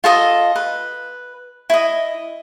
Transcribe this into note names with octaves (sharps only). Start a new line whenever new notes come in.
F4 A4 D#5
B4
E4 D#5